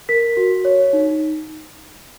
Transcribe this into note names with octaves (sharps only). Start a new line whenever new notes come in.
A#4 B6
F#4
C#5
D#4